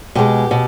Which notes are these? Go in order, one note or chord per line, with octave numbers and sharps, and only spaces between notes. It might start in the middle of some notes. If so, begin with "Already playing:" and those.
B2 G#3 G4
B2